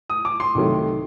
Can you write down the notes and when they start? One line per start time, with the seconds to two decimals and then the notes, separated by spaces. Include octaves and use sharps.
0.10 D#6
0.25 D6
0.40 C6
0.55 C2 C3 D#3 F#3 A3